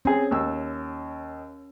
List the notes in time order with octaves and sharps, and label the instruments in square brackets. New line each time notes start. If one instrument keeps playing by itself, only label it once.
[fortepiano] C4 G#4 [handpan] C#4
[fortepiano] D#2 E6